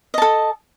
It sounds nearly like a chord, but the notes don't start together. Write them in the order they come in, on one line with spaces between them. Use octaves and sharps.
D#5 A5 A4